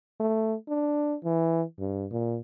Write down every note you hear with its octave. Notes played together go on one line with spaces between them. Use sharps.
A3
D4
E3
G2
A#2